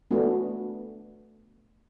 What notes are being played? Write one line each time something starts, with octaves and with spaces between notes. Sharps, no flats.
A3 B3 D4 F#4